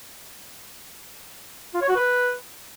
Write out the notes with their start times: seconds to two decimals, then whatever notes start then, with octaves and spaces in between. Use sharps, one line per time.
1.74 F4
1.81 C#5
1.89 F#4
1.96 B4